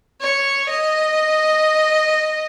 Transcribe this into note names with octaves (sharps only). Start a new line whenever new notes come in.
C#5
D#5